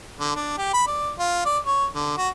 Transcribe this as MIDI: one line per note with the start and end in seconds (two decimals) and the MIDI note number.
0.20 0.33 50
0.36 0.55 62
0.58 0.71 67
0.74 0.83 83
0.87 1.11 74
1.19 1.45 65
1.45 1.58 74
1.66 1.86 73
1.93 2.16 50
2.18 2.29 66